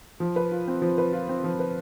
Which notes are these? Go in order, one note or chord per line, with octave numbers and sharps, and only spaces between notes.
F3
B4
F4
C4
F3
B4
F4
C4
F3
B4